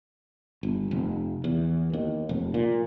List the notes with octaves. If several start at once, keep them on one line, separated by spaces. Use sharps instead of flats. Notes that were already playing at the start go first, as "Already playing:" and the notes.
G1
F1
E2
D#2
F1
A#2